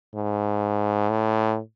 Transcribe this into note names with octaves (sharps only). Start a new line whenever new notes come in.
G#2
A2